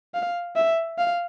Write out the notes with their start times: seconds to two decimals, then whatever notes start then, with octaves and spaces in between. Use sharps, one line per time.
0.15 F5
0.56 E5
0.98 F5